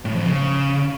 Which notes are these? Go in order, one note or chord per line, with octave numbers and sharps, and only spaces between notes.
A2
F2
C#3